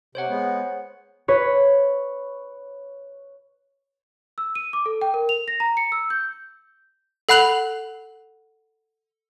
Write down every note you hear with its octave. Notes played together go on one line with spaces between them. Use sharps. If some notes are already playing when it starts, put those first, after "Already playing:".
C3 C5 C#5 F#5
G#3 B3
B4 C#5
E6
D#7
D6
A4
G5
A#4
F7
A#6
A#5
C#7
E6
G6
A4 F#5 B5 F#6 F7 F#7